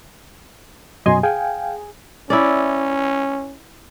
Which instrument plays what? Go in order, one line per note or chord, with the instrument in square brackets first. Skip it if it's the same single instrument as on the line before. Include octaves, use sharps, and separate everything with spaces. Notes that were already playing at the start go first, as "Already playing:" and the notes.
[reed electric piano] F#2 B2 F#3 [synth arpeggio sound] D#5 G#5 C6
[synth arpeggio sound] G#4 [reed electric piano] F5 G5 G#5
[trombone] C#4 [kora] E4 D5